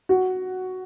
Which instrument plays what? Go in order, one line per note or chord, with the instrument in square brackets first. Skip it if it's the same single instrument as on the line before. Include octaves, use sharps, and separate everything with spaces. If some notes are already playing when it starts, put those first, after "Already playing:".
[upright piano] F#4